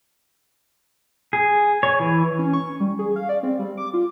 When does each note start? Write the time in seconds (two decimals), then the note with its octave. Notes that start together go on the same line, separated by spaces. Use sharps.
1.33 G#4
1.83 C#5
2.00 E3
2.39 C#4
2.53 C#6
2.80 G3
2.99 G#4
3.16 F5
3.29 D5
3.43 C4
3.59 G3
3.77 D6
3.94 F4